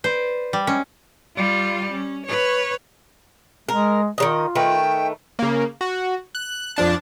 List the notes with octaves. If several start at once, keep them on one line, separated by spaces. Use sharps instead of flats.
B4 C5 D5
G3
G#3 C#4
G3 F4
C#4
B4 C#5
G#3 A#4
D#3 F#3 F4 D#5
D#3 A3 B4 G5
C#3 A#3
F#4
F#6
F2 F3 D4 A5